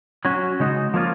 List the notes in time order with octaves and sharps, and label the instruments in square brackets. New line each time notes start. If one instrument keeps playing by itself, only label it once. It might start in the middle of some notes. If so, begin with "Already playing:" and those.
[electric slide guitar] F#3 C#4 F#4
C#3 G#3 D#4 F#4
F3 A#3 C#4 F4